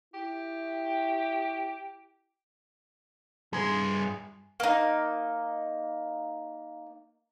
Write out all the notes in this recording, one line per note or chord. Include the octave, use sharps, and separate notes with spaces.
E4 G4
G2 G#4 C6
A#3 D#4